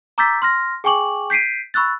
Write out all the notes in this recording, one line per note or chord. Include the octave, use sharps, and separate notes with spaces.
A#5 D6 E6 G6 A6 B6
C6 F6 A#6
G#4 G5 G#5 C#6 D6 F#7
G6 B6 C7 D7 D#7
B5 C#6 E6 F#6 A6